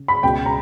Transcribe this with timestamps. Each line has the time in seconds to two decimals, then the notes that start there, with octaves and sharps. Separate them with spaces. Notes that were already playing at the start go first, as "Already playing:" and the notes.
Already playing: C#3
0.08 B5
0.23 C#2 B2 G5
0.46 A#5